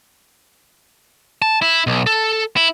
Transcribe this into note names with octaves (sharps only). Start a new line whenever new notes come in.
A5
E4
B1
A4
E4